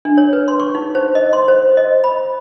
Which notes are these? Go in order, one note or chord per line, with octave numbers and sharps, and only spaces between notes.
D4
C#5
B4
C6
C#6
D#4
C5
D#5
C6
C5
D#5
B5